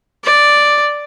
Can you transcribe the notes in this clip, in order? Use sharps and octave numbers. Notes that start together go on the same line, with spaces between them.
D5